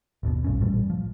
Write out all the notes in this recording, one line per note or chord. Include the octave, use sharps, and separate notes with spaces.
G#1 D#2 B2
B1 G2 C#4
A1 A#2 G3 A3
F3